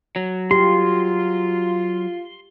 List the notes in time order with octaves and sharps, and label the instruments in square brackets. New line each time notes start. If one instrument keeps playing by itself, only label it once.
[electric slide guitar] F#3
[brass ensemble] F4 [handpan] G4 [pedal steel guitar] C6